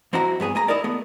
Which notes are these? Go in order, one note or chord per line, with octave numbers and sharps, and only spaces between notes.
F2 C4 E4 F#4 A#5
G2 B3 G#4 G#5
A3 G#5 A#5
D#4 E4 G#4 A#4 D5
A3 B3 G#4